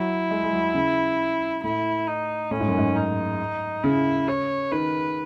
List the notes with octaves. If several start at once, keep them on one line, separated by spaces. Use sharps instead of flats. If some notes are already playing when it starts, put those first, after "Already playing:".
Already playing: F#3 E4
G#3
G#3
F#3
C#3
A2 E4
D#4
A2 C#4
G#2
F#2
G#2
D#4
C#3 E4
C#5
D#3 B4